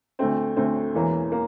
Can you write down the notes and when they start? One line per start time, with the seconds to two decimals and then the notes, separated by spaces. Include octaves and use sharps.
0.19 D2 D3 A3 C4
0.56 D2 D3 A3 C4
0.94 E1 E2 E3 A#3
1.32 A#3